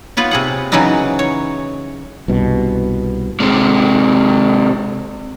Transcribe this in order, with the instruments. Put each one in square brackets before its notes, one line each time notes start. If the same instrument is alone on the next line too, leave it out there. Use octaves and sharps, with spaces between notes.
[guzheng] B3 F4 B4 C#5
C3 G#4 F#5
C#3 E3 F#3 C#4 D#4 B4
C#5
[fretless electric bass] C2 G2 B2
[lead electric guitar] C3 G#3